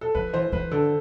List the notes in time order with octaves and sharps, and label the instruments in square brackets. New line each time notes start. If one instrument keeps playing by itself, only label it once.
[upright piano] A4
[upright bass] F3 [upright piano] B4
[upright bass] E3 [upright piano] C5
[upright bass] E3 [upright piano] B4
[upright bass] D3 [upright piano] A4